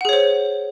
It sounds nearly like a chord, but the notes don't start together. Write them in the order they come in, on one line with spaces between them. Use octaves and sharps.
F#5 G#4 C#5 C5